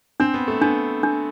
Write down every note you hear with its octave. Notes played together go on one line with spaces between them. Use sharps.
C4 D4
B3
A3
B3 D4
D4